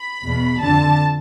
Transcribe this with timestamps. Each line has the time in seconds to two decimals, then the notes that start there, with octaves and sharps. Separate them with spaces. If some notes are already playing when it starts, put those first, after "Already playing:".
Already playing: B5
0.23 E2 B2
0.59 F2 D3 A5